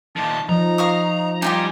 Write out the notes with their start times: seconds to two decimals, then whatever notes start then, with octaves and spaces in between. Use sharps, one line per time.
0.16 A#2 D#3 A5
0.49 F3 D#4 A#5
0.78 F5 C#6 D#6
1.42 G3 D#4 F4 G4 G#5